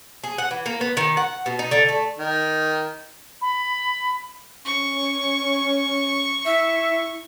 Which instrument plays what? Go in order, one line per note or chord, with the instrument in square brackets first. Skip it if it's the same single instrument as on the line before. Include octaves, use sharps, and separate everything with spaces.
[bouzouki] G#4
F#5
E3
A#3
B3
D#3
F#5
B2
D#4
D3
A3
[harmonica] D#3
[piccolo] B5
[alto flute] C#4 [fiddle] C#6
[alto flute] E4 [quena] E5